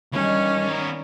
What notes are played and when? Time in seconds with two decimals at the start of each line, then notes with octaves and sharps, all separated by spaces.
0.13 D2 G2 D#3 E3 G#3 C#4
0.67 B3 A#4 D5 A#5